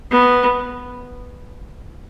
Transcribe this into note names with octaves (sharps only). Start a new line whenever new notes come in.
B3